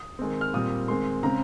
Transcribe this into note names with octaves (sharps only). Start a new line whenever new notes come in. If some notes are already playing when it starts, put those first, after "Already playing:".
Already playing: D#6
D#3 G#3 C4
F6
A#2 G3 C4 D#6
D#3 G#3 C4 C6
C#3 G#3 C4 A#5